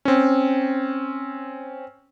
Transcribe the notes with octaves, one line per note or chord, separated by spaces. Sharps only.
C4 C#4